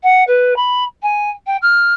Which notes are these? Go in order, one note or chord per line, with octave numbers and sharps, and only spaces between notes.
F#5
B4
B5
G#5
G5
F6